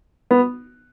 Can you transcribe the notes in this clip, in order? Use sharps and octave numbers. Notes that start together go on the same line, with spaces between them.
B3